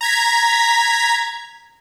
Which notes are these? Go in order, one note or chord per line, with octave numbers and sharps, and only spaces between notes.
A#5 G#6 B6